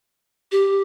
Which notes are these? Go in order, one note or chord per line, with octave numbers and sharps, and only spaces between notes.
G4